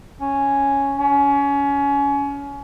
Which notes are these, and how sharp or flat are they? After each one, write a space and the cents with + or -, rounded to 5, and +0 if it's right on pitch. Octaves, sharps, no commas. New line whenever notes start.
C#4 +0
C#4 +25